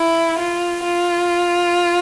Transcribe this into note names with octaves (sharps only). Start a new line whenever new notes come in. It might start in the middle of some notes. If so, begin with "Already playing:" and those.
Already playing: E4
F4
F4